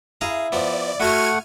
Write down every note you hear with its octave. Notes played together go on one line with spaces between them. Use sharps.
E4 G#4 F5 A#5
F3 B3 D5
A3 E4 F#4 F#5 C6 F6 G#6 D#7